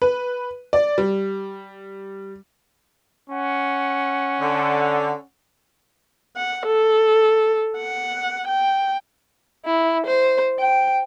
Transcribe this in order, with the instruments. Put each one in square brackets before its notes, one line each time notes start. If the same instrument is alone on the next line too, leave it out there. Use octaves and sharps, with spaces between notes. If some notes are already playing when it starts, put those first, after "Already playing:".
[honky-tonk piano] B4
D5
G3
[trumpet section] C#4 F#5
[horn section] D3
[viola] F#5
A4
F#5
G5
[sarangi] E4
C5
G5